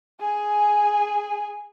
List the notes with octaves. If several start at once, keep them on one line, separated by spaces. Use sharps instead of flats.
G#4 G#5